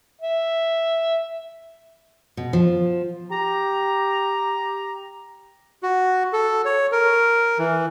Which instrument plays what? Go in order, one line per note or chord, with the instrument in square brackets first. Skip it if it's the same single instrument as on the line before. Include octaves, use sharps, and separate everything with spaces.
[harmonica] E5
[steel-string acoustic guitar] B2
F3
[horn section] G4 A#5
[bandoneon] F#4
A4
C#5
A#4
E3